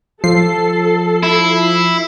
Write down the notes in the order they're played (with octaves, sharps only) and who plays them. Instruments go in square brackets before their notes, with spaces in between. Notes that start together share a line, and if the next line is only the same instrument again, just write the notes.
[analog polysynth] F3 C7 [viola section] A4
[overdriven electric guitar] E4